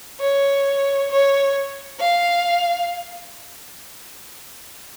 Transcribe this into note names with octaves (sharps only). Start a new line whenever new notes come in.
C#5
C#5
F5